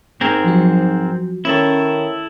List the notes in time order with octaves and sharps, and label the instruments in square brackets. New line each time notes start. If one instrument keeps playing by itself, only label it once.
[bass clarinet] G#2 [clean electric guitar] C4 G#4 A#4
[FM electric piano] F3 F#3 F#4
[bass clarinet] D#3 [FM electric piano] C#4 C#5 E6 [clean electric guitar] E4 A4